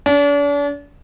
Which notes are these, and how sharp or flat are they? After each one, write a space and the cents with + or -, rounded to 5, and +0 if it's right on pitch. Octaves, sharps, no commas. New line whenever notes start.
D4 -40